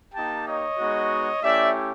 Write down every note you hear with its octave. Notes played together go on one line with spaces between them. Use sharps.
A#3 D#4 G4 G5 A5
C#5 D#5
G#3 B3 D#4 F#4
A3 C#4 E4 G4 D5 E5